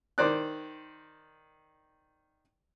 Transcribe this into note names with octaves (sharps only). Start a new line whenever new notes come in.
D#3 C5 D5 F#6